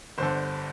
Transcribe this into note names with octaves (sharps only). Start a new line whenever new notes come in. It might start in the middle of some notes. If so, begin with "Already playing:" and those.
G1 G2 D3 C5